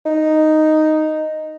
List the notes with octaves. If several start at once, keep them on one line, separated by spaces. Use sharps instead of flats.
D#4